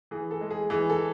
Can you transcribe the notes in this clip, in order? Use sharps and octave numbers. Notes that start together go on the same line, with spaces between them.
E3 G#4
A4
G#3
G#4
E3 G#4
A4